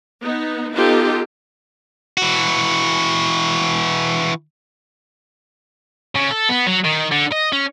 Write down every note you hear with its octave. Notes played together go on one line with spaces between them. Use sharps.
B3 D#4
B3 D#4 F4 G4 A4
E3 F#4
C#3
A4
B3
F#3
D#3
D3
D#5
C#4